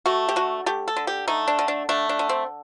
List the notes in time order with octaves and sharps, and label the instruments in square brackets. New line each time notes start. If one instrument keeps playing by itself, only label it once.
[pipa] A3 F#4
G4
D3 F#4
A3 G4
A4
D3
G4
A3 D#4
D4
D3
D4
A3 D4
D4
D3
C4